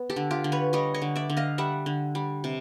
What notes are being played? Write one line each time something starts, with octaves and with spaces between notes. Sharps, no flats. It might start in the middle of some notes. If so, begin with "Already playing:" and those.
Already playing: B3
G4 A4
D3
F4 G4
D3
B4 C#5
G3 C#5 D#5
C#5 D#5
D3
D5 E5
D3
D#5 F5
G3 E5 F#5
D3
G3
C3